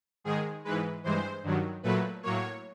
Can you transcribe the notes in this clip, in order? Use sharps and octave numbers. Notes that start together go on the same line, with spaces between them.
G#2 D#3 G#3 G#4
G#2 E3 G#3 B4
G2 E3 G#3 C5
G2 D#3 F#3
A#2 F#3 A3 B4
A2 F#3 A#3 C#5